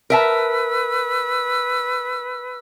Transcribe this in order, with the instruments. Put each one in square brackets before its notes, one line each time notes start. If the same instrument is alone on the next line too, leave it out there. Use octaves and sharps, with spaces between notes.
[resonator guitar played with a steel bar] A#4 E5 A5 [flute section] B4 E6